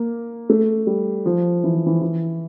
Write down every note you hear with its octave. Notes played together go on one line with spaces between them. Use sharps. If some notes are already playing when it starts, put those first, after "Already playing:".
Already playing: A#3
A3
G3
F3
E3
F3
E3
E3